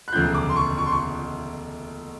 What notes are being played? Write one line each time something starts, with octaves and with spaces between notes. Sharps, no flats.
F#6
E1 D2 C#3 F3 G6
D6
C6
C#6
C#6
C6
C#6